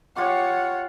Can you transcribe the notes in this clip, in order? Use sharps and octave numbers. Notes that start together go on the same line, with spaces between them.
F4 G4 C#5 F#5 D6